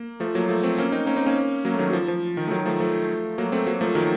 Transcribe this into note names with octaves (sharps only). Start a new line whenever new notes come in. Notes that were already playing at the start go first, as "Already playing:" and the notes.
Already playing: A#3
F3 A3
F#3 A#3
F3 A3
A3 C4
A#3 C#4
C4 D#4
A#3 C#4
C4 D#4
A#3 C#4
F#3 A#3
A3
D#3 F#3
F#3
F3
F3
D#3
A3
D#3 F#3
F3 A3
F3 A3
F#3 A#3
A3 C4
F#3 A#3
F3 A3
D#3 F#3